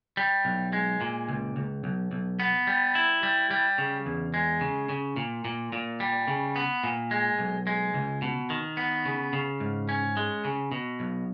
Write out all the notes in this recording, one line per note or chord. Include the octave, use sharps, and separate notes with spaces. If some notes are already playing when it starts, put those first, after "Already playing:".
G3
B1
G#3
A#2
C#2
C#2
B1
B1
B3
G3
E4
G3
G3
C#3
E2
G#3
C#3
C#3
A#2
A#2
A#2
G3
C#3
B3
A#2
G#3
B1
G#3
C#2
B2
D#3
B3
C#3
C#3
G#2
C#4
G#3
C#3
B2
B1